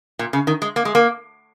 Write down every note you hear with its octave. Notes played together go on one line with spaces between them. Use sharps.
A#2
C#3
D#3
G#3
A#3
G#3
A#3